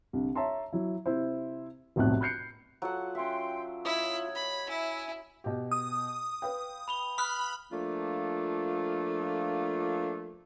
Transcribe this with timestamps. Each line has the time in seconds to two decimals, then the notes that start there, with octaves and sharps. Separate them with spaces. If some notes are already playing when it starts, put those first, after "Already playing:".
0.13 C2 D3
0.35 C#5 E5 A5 A#5 C6
0.73 F#3 E4
1.06 C3 E4 C5
1.96 F1 B1 A2 C3 F#6
2.21 B5 F#6 G6 C7 C#7
2.82 F#3 F4 A4 F#5
3.15 C#4 E5 G5 C6
3.85 E4 C#5 D#5
4.35 B5
4.69 E4 E5 G#5
5.44 B2 G4
5.71 D#6
6.42 B4 F5 G5
6.88 B5 F7 G7
7.18 B5 D#6 F6 F#6
7.72 F3 A3 A#3 D4 F4